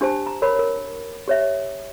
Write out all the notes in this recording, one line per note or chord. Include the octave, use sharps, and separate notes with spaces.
D4 G4 C5 A5
A#5
A#4 C#5 B5
A#4
G4 C#5 E5